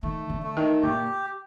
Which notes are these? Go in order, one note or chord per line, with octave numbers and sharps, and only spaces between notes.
D#3 A3
D3
A3
D#3
A#2 G4